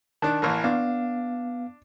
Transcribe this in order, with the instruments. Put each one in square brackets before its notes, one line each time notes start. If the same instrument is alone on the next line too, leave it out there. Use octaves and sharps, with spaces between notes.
[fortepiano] D#3 D4 [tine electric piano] A5 F#6
[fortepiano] A1 E3 A#3
[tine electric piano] B3 F5 [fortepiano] D4